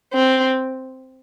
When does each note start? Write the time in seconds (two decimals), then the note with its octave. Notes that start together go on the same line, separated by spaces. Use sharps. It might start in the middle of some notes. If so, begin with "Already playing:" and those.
0.13 C4